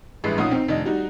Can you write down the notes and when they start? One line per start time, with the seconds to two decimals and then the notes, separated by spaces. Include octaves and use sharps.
0.24 A1 G2 G#3 E4 B4 C7
0.38 B1 A#2 C#4 D#4 F#5 D#6
0.51 C4 D#4
0.68 F1 D#3 D4 D#5
0.85 G3 D#4 F#4